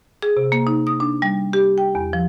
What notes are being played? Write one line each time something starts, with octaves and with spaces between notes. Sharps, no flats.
G#4
C3
A#3
D#4
D#6
D4
G3
G4
G5
E2
F3